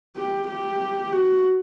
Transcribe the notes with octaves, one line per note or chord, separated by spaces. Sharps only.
G4
G4
F#4